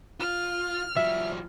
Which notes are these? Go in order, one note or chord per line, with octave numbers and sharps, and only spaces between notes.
F4 F6
F3 G3 E5